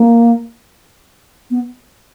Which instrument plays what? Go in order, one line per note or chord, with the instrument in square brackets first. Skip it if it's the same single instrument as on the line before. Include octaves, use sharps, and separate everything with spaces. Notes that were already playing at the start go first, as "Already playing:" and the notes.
Already playing: [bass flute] A#3
B3